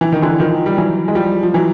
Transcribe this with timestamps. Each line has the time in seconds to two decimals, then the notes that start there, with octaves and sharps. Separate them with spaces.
0.01 E3
0.12 D#3
0.22 D3 E3
0.40 D#3 F3
0.66 G3
0.77 E3 F#3
1.08 G#3
1.15 F3 G3
1.43 F3
1.54 E3 F#3